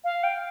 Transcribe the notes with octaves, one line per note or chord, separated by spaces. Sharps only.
F5
G5